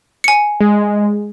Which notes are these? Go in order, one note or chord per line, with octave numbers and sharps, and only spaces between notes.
G#5 C#7
G#3